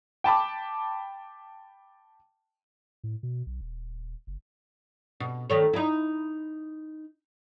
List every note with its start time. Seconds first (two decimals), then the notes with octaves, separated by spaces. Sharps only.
0.24 G5 A5 B5 D6
3.04 A2
3.23 B2
3.46 B1
3.61 D#1
4.27 F#1
5.20 B2
5.50 D#3 A3 C#5
5.73 D#4 E4